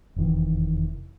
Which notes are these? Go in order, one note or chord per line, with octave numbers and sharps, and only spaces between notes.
F1 E2 D#3 E3